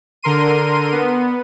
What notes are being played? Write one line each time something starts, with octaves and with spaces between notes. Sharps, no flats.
D3 A#4 C6 D#7
B3